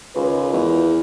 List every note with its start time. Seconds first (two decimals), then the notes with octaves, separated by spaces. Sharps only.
0.15 C#2 D#3 F4 B4
0.53 E2